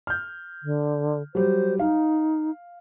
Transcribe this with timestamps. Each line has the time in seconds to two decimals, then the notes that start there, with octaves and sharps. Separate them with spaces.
0.07 F6 G6
0.63 D3
1.35 F#3 G3 C5
1.79 D#4 F5